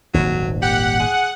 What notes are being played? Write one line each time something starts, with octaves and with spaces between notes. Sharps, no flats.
D#1 G#1 D#2 F#3
G4 F#5
G#4